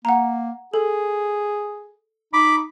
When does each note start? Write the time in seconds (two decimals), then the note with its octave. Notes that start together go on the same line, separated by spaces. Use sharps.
0.05 A#3 F#5 A#5
0.74 G#4 A4
2.33 D#4 B5 D6